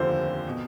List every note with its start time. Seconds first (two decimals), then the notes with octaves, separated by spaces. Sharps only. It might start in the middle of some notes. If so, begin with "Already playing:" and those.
Already playing: F1 D#2 D3 F3 C5
0.49 B2